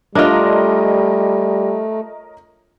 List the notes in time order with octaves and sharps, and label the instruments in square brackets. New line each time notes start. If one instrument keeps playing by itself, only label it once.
[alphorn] G3 [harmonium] A3 [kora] D4 F4 [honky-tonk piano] A#4 C#5 D#5